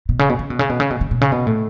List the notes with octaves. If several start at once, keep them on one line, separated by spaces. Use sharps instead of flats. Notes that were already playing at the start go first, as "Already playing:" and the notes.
B2
C#3
B2
C#3
B2
C#3
B2
C#3
B2
C#3
B2
C#3
B2
A2